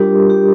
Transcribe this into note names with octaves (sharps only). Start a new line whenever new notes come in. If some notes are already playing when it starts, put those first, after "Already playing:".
Already playing: G3 D4 F4 G4 A#4
G4